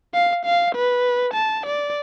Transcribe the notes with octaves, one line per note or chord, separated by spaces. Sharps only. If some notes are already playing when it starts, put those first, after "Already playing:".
F5
F5
B4
A5
D5